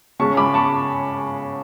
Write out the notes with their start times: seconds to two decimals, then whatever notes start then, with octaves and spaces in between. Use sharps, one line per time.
0.19 C#3 G#3 C#4 A5 C#6
0.37 B5 D6
0.54 A5 C#6